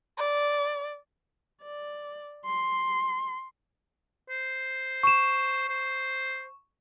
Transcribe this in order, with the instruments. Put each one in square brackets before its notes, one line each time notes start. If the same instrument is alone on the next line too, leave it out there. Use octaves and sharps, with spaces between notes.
[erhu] D5
[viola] D5
C6
[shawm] C5
[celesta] C#6 E7
[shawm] C5